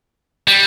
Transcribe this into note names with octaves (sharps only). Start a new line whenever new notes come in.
G3